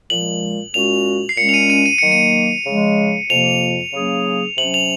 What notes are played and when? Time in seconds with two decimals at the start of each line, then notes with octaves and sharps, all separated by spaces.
0.10 A#2 F3 G#3 F#7
0.74 A#2 G#3 C#4 F#4 F7
1.29 C7
1.37 A#2 G#3 C#4 C#7
1.49 F7
1.54 D#7
1.70 D#7
1.86 D#7
1.98 D#3 F#3 A#3 C#7
2.12 D#7
2.66 C#3 F3 G#3
3.30 F2 C3 F3 A#3 F4 F7
3.93 C#3 F#3 A#3 C#4 G#4
4.57 C3 F#3 C#4 F#7
4.74 F7